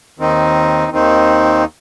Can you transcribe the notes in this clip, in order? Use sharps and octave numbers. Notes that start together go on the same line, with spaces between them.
D#2 D#3 C4 D#4
D#2 D#3 C4 D#4